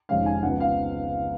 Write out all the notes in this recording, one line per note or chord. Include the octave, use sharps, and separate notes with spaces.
F1 F2 D#3 G#3 C#4 F5
G#5
C#2 C#3 F3 B3 F#5
F5